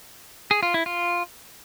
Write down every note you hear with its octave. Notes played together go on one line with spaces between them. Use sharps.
G#4
F4
E4
F4